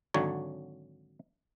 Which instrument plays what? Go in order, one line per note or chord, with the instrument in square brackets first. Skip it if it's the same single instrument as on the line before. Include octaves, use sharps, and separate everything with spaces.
[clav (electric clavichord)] G#1 D3 F#3 C#5